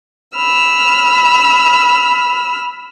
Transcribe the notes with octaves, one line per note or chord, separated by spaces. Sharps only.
B5 E6 F6